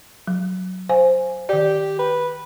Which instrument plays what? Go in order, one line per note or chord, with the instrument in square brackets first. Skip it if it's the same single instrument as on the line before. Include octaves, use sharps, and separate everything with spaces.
[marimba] F#3
C5 F5 G#5
[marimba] D#3 D5 [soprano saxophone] G4
[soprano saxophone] B4